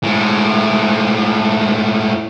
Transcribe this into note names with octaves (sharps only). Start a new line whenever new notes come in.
A2 G#3